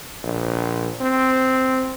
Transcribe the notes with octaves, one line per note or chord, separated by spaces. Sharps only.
A#1
C4